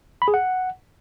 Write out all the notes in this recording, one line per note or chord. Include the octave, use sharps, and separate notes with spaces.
B5
G#4
F#5